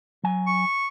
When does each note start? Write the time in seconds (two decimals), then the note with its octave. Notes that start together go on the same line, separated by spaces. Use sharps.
0.24 F#3 G#5
0.47 C#6